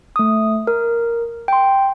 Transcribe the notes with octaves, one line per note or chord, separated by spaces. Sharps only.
A3 D#6
A#4
G5 C6